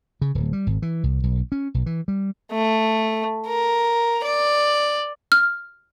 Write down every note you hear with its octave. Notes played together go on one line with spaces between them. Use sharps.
C#3
D1
G3
G#1
E3
C2
B1
C#4
B1
E3
G3
A3
A#4
D5
F6